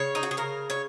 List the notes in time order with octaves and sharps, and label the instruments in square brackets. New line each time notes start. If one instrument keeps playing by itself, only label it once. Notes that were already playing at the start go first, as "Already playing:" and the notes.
Already playing: [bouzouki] C#3 C#5
D#4
F#4
G#4
C#3 A#4
C#5